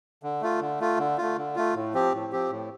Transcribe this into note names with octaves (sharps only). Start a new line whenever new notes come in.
D3
A3 F4
D3
A3 F4
D3
A3 F4
D3
A3 F4
A2
F3 C4 G4
A2
F3 C4 G4
A2